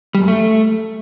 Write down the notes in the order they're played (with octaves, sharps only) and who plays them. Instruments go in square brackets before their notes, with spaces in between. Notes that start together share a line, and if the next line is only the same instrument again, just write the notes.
[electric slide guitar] G3
F#2
A3